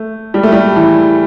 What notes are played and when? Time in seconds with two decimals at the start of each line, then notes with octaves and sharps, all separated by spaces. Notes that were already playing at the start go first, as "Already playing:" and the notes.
Already playing: A3
0.34 G3
0.43 A3
0.52 G3
0.76 E3